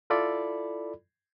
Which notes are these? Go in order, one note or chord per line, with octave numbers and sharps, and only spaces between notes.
E4 F4 A4 D5 B5